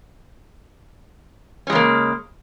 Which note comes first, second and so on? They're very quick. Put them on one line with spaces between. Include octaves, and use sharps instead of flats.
C#4 G#3 C#3 A#3